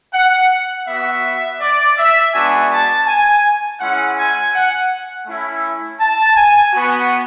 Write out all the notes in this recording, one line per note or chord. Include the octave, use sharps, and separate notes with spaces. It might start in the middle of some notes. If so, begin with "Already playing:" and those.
F#5
B3 F#4 E5
D5
E5
G#3 B3 D4 F#4 G#5
A5
G#5
G#3 C#4 E4 F#5
G#5
F#5
A3 C#4 E4
A5
G#5
B3 F#4